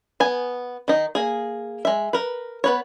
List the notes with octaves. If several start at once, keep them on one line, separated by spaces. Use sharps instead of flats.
B3 G#5
D#3 D#4
A#3 G#4
G#3 E5
A#4 B4
B3 B4 C#5